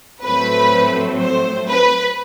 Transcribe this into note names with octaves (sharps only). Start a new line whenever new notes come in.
A2 F#3 A3 C4 B4
C5
B4